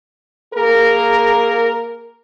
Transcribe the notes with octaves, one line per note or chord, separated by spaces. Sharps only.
A#3 G#4 A#4